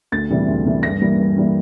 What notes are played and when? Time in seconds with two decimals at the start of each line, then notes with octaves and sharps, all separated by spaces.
0.12 D2 A6
0.30 C3 E3 G3
0.48 D2
0.66 C3 E3 G3
0.83 G2 A#6
1.01 E3 G3 A#3
1.19 G2
1.36 E3 G3 A#3